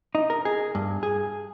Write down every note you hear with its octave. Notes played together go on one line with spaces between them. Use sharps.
D#4
A#4
G#4
G2
G#4